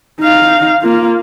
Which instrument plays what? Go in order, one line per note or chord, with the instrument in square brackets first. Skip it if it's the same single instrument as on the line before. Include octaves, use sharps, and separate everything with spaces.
[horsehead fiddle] D#4 F5
A#3 F4